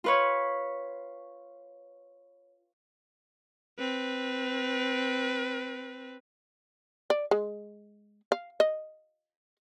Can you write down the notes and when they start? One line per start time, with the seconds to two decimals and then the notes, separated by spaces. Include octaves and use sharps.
0.04 F4 B4 C#5
3.78 C4 B4
7.10 D5
7.31 G#3
8.32 F5
8.60 D#5